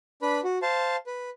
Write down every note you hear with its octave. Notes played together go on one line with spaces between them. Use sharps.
D4 B4 B5
F#4
C5 F5 A5
B4